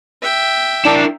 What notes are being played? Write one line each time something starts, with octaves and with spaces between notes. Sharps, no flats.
E5 G5
D4 E4 A#4